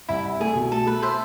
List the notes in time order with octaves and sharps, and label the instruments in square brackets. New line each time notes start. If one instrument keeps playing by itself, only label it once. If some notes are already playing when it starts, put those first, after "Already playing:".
[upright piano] C2 [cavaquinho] E4
[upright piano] C2
[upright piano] A3 [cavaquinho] G#4
[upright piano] B2
[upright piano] A3 [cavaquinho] A4
[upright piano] A3 [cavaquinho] B4
[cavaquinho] C5 E5